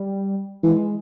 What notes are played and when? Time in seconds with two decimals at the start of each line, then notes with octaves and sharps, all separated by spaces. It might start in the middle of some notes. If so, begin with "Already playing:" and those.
Already playing: G3
0.63 E3 G#3